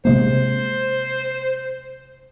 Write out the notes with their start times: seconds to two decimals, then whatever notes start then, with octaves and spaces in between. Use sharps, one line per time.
0.05 C3 G#3 A#3 C5